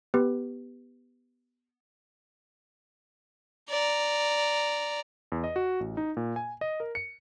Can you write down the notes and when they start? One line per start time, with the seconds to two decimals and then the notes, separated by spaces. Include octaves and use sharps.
0.14 B3 G4 B4
3.70 D5 A#5
5.32 E2
5.44 D#5
5.56 F#4
5.80 A1
5.97 D#4
6.17 A#2
6.36 G#5
6.61 D#5
6.80 A#4
6.95 C#7